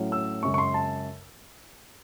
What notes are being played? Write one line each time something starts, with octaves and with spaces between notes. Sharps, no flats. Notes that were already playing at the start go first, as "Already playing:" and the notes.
Already playing: A2 F#3 C#4
E6
F#2 C#3 G#3 C#6
C#6
C6
A5